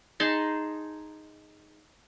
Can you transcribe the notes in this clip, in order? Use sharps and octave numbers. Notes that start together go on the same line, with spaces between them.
D#4 G#4 A5 C6